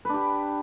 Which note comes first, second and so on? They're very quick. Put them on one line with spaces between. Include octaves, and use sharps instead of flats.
B4 D4 G4